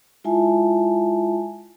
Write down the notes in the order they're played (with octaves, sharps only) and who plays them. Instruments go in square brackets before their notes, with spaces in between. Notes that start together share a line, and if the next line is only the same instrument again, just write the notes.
[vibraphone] G#3 E4 F4 E5 G#5 A5